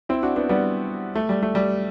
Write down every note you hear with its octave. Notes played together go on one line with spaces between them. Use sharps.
C4 E4
D4 F#4
B3 D4
G3 B3
A3
G3
A3
G3